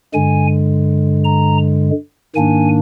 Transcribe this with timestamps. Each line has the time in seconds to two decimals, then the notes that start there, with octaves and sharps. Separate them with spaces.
0.13 G2 D3 G#3 G#5
1.25 A#5
2.36 G#2 D#3 A#3 D4 G#5